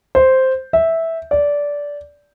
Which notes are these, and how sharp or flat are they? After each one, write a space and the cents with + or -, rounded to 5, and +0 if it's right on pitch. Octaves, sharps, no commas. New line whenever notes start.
C5 +0
E5 -10
D5 -15